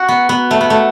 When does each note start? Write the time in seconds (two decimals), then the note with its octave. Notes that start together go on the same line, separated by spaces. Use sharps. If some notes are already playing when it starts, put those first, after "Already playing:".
Already playing: F#4
0.09 B3
0.29 B3
0.51 A3
0.61 B3
0.70 A3